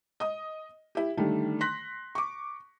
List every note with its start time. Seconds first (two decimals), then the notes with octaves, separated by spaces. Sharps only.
0.20 D#5 D#6
0.95 E4 G4
1.17 D3 D#3 G3 A3
1.61 C6 F#6 A#6 B6
2.15 C#6 D6